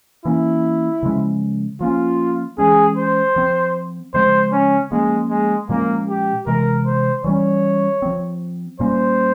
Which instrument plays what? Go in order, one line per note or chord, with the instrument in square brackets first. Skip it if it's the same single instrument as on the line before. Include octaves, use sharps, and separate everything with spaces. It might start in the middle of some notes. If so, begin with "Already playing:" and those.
[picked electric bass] E3 A#3 C#4 [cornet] E4
[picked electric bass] C#3 F3 G#3 C#4
[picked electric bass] F3 A#3 C#4 [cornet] F4
[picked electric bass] E3 G#3 C#4 [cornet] G#4
[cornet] C5
[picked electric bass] F3 C4
[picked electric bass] C#3 F3 G#3 C4 [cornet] C5
[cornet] C#4
[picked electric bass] F3 A#3 C#4 [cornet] G#3
[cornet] G#3
[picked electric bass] A#2 F3 G#3 C#4 [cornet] A#3
[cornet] G4
[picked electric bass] C3 E3 G#3 [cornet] A#4
[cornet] C5
[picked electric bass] E3 G3 C#4 [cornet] C#5
[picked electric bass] F3 C4
[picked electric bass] A#2 G3 A#3 C#4 [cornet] C5